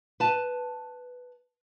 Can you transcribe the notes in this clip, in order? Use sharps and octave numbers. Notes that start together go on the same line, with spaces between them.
B4 A5